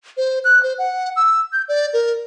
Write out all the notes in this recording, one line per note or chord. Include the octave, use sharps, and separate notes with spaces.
C5
F#6
C5
F#5
E6
G6
D5
A#4